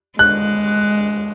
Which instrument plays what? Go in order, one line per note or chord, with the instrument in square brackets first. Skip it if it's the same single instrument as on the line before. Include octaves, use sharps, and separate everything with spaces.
[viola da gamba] G#3 [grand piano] F#6